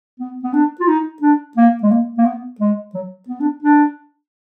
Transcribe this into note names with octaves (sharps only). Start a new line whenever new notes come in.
B3
B3
D4
F4
D#4
D4
A#3
G#3
A#3
A#3
B3
G#3
F#3
B3
D4
D4